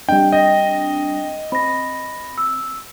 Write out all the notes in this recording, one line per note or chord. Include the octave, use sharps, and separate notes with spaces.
G3 C4 D4 D#5 G5
D#5 G5 A#6
C4 B5 A#6
E6